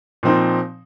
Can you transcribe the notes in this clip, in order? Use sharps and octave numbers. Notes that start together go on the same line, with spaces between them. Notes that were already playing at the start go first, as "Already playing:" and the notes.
A#2 F3 C4 D#4